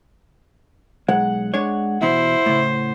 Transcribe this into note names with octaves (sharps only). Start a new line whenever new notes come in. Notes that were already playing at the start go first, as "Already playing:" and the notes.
B1 G#3 F#5
G#3 D4 C#5
E2 B2 E4 C5
A2 C#3